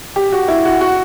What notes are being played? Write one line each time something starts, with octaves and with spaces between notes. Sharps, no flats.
G4
F#4
E4
F#4
F#4